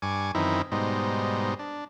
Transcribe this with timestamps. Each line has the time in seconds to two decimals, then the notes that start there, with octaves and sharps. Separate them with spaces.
0.02 G2 G#5 C#6 D6
0.35 F#2 D#3 E3 C4 D#4 E4
0.72 G#2 B2 G3 D#4 C5
1.59 D4